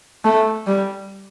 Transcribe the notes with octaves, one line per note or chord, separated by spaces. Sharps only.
A3
G3